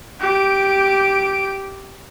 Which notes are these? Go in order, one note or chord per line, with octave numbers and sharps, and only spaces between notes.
G4 D7